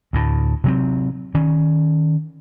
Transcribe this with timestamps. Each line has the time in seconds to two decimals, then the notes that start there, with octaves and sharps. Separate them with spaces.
0.13 D2 A2
0.64 C3 F#3 C4
1.34 D#3 C#4